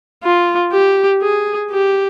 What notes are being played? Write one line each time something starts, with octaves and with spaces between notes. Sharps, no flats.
F4
G4
G#4
G4